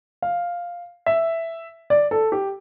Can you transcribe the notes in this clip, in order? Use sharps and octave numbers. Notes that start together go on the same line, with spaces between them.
F5
E5
D5
A4
G4